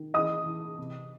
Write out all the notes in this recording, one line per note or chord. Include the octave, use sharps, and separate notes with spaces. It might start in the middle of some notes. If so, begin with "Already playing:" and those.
Already playing: D#3
E3 D#5 D#6
E3
C3